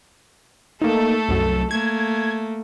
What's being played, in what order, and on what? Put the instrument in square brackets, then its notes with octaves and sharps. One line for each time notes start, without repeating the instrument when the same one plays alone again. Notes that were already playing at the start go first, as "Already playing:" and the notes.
[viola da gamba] A3 A4 [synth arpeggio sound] A#3 D#4
[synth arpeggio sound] C2 F#2
[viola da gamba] A3 A#3 [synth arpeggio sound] G#6